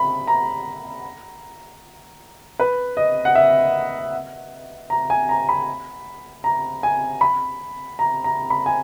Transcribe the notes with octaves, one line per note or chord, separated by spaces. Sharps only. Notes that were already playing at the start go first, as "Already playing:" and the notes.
Already playing: B5
A#5
B4
D#5
F#5
E5
A#5
G#5
A#5
B5
A#5
G#5
B5
A#5
A#5
B5
G#5